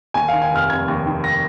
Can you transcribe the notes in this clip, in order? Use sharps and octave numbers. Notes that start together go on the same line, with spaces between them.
D#2 G#5
D#3 F5
G#5
F1 F6
F1 G#6
D#2
D#3
A#6